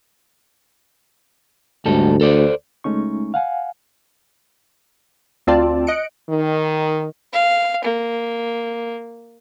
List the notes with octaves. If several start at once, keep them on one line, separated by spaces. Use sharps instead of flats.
D2 G#2 G3 A4
A4 C5 D5
C#2 G#3 A3 C#4 D#4 C#6
F5 F#5 G#5
D2 C4 F4 D5 A5
D#5 F#6 C#7 D7
D#3
F5
A#3